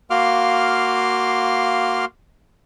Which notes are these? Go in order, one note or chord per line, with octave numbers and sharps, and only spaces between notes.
A#3 F#4 F5 C6 D6 F6